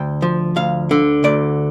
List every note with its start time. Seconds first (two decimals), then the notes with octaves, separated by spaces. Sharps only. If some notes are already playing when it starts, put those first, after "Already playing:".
Already playing: D2 G5
0.22 F3
0.56 D2 F5
0.91 D3
1.24 D2 D5